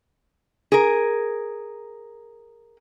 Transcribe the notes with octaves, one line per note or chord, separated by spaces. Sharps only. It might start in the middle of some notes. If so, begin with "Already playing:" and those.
G#4 A#4